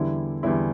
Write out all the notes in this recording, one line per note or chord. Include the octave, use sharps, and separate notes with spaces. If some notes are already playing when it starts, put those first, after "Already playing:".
Already playing: E2 D3 G3 E4
E2 D3 G3 E4